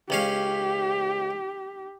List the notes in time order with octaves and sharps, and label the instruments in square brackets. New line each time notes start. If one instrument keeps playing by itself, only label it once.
[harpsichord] C#2 C#4 F5 [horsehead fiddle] G4